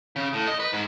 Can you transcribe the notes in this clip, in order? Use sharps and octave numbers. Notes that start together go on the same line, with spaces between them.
C#3
A2
D#5
B4
G#2